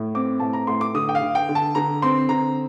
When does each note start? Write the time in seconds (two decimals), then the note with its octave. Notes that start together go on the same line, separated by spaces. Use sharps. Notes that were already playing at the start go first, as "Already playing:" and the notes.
Already playing: A2
0.15 C4 D6
0.40 A2 A5
0.53 A#5
0.67 A2 C6
0.81 D6
0.94 D3 D#6
1.09 G5
1.15 F5
1.21 D3
1.35 G5
1.49 D3
1.55 A5
1.75 D3 A#5
2.02 C4 C6
2.29 D3 A#5